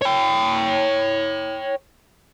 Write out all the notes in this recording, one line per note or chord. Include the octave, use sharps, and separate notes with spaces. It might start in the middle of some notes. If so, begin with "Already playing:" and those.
C#5 G5